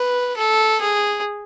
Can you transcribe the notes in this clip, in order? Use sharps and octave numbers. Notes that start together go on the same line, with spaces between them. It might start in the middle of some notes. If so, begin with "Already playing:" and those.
Already playing: B4
A4
G#4